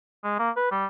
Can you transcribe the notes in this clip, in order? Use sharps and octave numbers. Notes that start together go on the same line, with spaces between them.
G#3
A#3
B4
G3